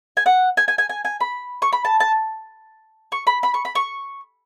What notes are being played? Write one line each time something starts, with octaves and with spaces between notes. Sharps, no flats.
G#5
F#5
G#5
G#5
G#5
G#5
G#5
B5
C#6
B5
A5
A5
C#6
B5
B5
C#6
B5
C#6